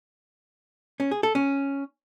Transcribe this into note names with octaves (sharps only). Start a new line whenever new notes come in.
C#4
G#4
A4
C#4